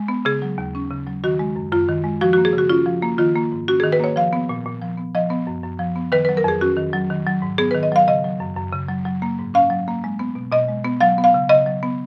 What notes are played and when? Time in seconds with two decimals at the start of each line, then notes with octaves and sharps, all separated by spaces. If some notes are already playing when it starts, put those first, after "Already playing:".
Already playing: G#3
0.08 B3
0.25 C#3 G#4
0.42 F#3
0.58 D#2
0.75 C#4
0.91 C#3
1.07 F#3
1.24 D#3 F#4
1.39 G#3
1.56 F#2
1.72 F#2 F4
1.88 D#3
2.04 G#3
2.21 F3 F#4
2.33 A#3 F#4
2.45 G#4
2.53 C#3
2.58 F#4
2.70 C#4 F4
2.86 F3
3.02 A#3
3.18 D#3 F4
3.36 A#3
3.52 G#2
3.68 C#4 F#4
3.80 D#3 G#4
3.92 B4
4.00 A#3 C#5
4.16 F3 F5
4.33 B3
4.49 A#2
4.66 A#2
4.81 F3
4.97 B3
5.15 F3 D#5
5.30 B3
5.47 F#2
5.63 F#2
5.79 F3
5.96 B3
6.12 D#3 B4
6.25 F#3 B4
6.37 A#4
6.44 F2 G#4
6.61 C#4 F#4
6.77 D#3
6.93 F#3
7.10 D#3
7.27 F#3
7.42 G#2
7.58 B3 G#4
7.71 D#3 B4
7.83 D#5
7.92 F#3 F5
8.08 C#3 D#5
8.24 F#3
8.40 F#2
8.57 F#2
8.73 C#3
8.89 F#3
9.05 F#3
9.22 A#3
9.39 G#2
9.54 C#4 F5
9.70 F#3
9.88 A#3
10.04 G#3
10.19 B3
10.35 B2
10.52 B2 D#5
10.68 G#3
10.84 B3
11.01 F#3 F5
11.18 B3
11.24 F5
11.34 C#3
11.49 C#3 D#5
11.66 F#3
11.83 B3